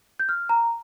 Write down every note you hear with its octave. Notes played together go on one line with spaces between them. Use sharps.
G6
F6
A#5